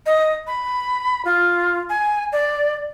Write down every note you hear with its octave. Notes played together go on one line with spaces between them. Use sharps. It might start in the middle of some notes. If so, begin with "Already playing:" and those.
D#5
B5
F4
G#5
D5